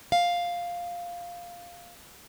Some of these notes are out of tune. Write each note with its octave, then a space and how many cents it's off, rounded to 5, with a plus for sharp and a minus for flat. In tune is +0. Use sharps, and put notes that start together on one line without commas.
F5 +0